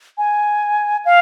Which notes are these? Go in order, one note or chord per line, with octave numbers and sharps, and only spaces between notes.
G#5
F5